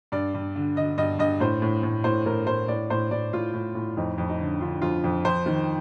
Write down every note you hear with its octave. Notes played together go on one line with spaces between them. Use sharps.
G2 D5
G2
D3
D3 D#5
G2 D#5
G2 D#5
A2 C5
A2
A2
A2 C5
A2 A#4
A2 C5
A2 D5
A2 C5
A2 D5
A2 F4
A2
A2
F2 D#4
F2
D#4
D3
D3 F4
F2 F4
F2
F2 C5
D#3